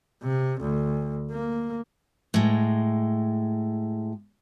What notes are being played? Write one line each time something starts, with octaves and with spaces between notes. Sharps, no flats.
C3
D2
A#3
A2 G#3